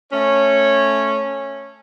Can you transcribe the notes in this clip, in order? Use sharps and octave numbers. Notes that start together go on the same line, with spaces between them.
A3 C#4 C#5